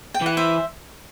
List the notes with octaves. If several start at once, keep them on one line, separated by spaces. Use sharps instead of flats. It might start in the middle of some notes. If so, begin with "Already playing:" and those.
G5
E3 F#5
C5 E5